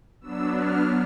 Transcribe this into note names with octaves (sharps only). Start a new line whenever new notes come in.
F#3 B3 D4 E6
F6